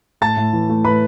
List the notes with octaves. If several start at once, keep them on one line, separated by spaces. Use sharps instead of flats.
A2 A5 A6
A2
E3
A3
A2 B4 B5